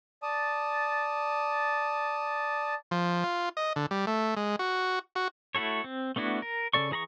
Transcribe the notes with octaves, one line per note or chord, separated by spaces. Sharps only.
D5 A5 D#6
F3
F4
D#5
D3
G3
A3
G#3
F#4
F#4
A3 E4 F#4 A4 C#5
C4
A3 B3 D4 E4 F#4
A#4
C#3 C4 A4 D5 C#6
E3 G#4 A#5 B5 C#6